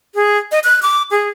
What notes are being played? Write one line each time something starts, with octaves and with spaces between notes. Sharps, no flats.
G#4
D#5
F#6
D6
G#4